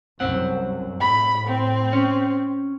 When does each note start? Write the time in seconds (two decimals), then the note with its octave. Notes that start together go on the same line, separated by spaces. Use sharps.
0.20 C2 F#2 C4 F#5
1.01 A2 B5
1.47 C4
1.93 C#4